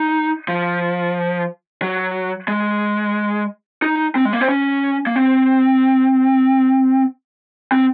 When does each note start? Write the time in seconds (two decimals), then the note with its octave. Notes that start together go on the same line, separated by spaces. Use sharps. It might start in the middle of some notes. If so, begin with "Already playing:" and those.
Already playing: D#4
0.48 F3
1.82 F#3
2.48 G#3
3.82 D#4
4.15 C4
4.25 G#3
4.33 A#3
4.41 C4
4.49 C#4
5.07 A#3
5.16 C4
7.72 C4